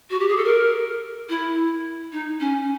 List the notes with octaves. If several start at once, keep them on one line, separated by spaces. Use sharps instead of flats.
F#4
G4
G#4
A4
A#4
E4
D#4
C#4